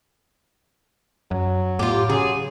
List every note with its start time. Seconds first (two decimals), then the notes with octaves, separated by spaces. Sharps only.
1.31 F#2 F#3
1.79 A2 F4 G4
2.09 C#3 F#3 G#4